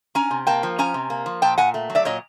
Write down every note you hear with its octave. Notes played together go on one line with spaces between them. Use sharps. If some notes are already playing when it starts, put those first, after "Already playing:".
C#4 G#5 A#5
C3
A#3 G5 A5
F3
C#4 G#5 A#5
C3
A#3
F3
A#2 G5 A5
A#2 F#5 G#5
A3
F#3
D5 E5
A#2 C#5 D#5